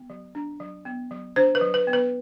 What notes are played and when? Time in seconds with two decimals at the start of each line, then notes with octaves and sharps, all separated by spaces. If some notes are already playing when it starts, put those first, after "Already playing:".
Already playing: B3
0.10 F#3
0.35 D4
0.60 F#3
0.85 B3
1.11 F#3
1.36 D4 C5
1.55 B4
1.61 F#3
1.74 B4
1.87 B3
1.93 B4